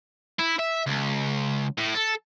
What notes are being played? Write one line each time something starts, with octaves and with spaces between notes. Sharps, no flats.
E4
E5
C#2
A2
A4